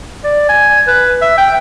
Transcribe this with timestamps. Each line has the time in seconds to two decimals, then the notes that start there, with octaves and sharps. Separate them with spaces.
0.24 D5
0.49 G#5
0.88 B4
1.22 E5
1.37 G5